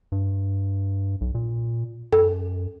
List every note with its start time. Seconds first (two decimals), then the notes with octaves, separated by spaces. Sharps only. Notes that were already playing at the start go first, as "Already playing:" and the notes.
0.12 G2
1.21 B1
1.35 A#2
2.13 F#2 A4